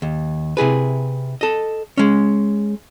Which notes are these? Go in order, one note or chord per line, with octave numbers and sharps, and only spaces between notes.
D#2
C3 E4 G#4 B4
A4 D#5
G#3 C#4